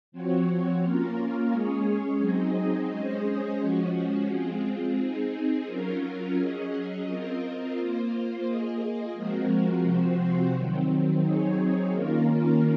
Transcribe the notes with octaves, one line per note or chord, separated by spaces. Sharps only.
F3 C4 F#4 C#5
A#3 C#4 F4 A#4
G#3 C#4 G#4 C#5
F#3 C4 D#4 G#4 D#5
G#3 C#4 G#4 C5 D#5
F3 G#3 C#4 F#4
G#3 C4 F4 G#4
C4 D#4 G#4
F#3 C#4 F4 A#4
F#3 C#4 G#4 D#5
C4 F4 A#4 D#5
A#3 F4 C5
A#3 F4 G#4 D#5
F3 G#3 C4 F#4 A#4
C3 F3 C4 F#4 C5
D#3 F#3 C4
F#3 C4 D#4 G#4 C#5
D#3 A#3 C#4 F4 A#4